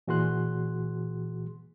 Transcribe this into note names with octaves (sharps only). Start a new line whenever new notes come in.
A#2 E3 F#4 G#4 C6 F#6